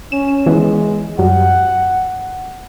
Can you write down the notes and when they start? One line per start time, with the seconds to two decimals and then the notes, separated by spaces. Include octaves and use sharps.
0.12 C#4 E7
0.46 E3 G#3 B3
1.19 F#2 G3 F#5